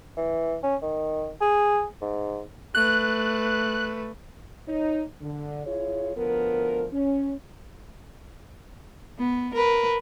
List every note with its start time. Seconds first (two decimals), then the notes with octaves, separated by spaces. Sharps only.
0.17 E3
0.63 C#4
0.82 D#3
1.41 G#4
2.01 G#2
2.75 A3 B4 F#6
4.67 D#4 C#5
5.21 D3
5.66 E4 F4 G#4 C#5
6.17 D2 F3 B3 A#4
6.93 C#4
9.18 B3
9.54 A#4 B4